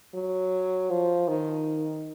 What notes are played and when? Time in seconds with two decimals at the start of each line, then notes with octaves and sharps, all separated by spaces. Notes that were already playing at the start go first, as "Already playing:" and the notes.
0.15 F#3
0.90 F3
1.28 D#3